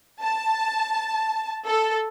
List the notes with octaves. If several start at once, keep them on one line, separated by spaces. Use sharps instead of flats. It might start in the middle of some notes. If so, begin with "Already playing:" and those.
A5
A4